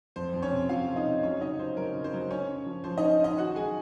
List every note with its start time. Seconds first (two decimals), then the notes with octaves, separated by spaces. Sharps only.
0.16 F2 C5
0.34 F2
0.42 C#4 C#5
0.52 C3
0.69 F2 F4 F5
0.87 F2
0.96 D#4 D#5
1.05 C3
1.23 F#3 C#4 C#5
1.41 C#3 D#4 D#5
1.59 F#3 C5
1.77 F#3 A#4
1.95 C#3
2.04 C5
2.13 F#3
2.31 C#4 C#5
2.48 C#4
2.66 F3
2.84 F3 C5
2.98 C#4 D#4 D#5
3.20 C#4 D#4 D#5
3.38 D#3 F#4 F#5
3.56 F#3 G#4 G#5